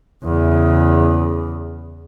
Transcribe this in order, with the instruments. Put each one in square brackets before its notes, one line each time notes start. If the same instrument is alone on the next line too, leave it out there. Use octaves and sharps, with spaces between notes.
[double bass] E2 C#3